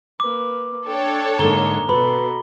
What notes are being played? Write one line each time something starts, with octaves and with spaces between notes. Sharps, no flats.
A#3 B4 D6
D4 A4 C#5 G5
G#2 D3 A#3 G#4 A#5 G7
B2 F#4 A4 B4 B5